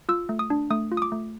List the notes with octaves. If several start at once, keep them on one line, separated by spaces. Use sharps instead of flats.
F4 E6
A3
D#6
D4
A3 D#6
F4
D#6
D6
A3